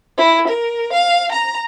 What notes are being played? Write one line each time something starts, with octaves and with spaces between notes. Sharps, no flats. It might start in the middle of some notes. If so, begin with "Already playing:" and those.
E4
A#4
F5
A#5